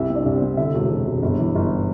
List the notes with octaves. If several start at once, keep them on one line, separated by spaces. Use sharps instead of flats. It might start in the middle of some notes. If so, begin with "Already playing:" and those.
Already playing: C2 E4 E5
C3
D4 D5
C2
C4 C5
C3
D3 E4 E5
E1
E1
E1
G1
E3
G1